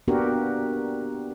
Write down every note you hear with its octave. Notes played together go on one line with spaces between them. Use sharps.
A#3 B3 D4 F#4 G4 A#4